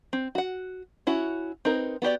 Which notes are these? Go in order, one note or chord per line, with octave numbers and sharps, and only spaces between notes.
C4
F#4 F#5
C#4 E4 F#4
C4 D#4 A#4 B4
B3 F#4 G4 D5